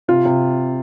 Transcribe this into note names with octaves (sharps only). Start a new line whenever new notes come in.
C3 F4
C3